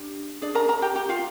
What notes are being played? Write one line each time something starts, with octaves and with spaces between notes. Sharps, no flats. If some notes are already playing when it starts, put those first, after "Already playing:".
Already playing: D4 G4
D4 G#4 D5
A#4 A#5
A#4 A#5
G4 G5
G4 G5
F4 F5